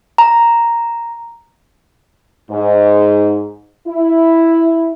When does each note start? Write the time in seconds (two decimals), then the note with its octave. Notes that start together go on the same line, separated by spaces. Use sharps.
0.18 A#5
2.51 G#2
3.88 E4